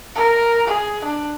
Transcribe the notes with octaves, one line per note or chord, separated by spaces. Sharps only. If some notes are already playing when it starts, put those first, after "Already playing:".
A#4
G#4
D4